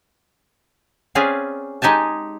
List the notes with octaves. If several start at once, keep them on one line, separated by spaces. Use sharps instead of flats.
C4 C#4 G#4 B4 D5 F5
G#3 D#4 G4 G#5 A5